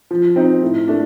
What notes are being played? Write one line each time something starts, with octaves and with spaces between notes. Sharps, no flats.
F3
C4 D#4
A2
A3 D4